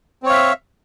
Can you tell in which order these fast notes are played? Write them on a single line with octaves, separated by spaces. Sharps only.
C4 C#5 F5 E5